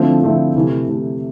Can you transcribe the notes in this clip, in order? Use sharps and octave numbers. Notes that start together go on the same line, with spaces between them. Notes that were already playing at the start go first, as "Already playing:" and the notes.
Already playing: D3 F3 A3 C4 E4
D3 F3 A3 C4 E4
C3 E3 A3
C3 E3 A3